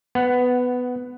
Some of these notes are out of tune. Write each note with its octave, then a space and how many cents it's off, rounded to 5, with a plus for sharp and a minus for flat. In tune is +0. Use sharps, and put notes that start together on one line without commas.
B3 +10 F#5 +0